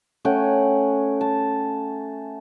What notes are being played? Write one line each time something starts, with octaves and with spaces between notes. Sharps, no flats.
A3 C#4 F#5 G5
A5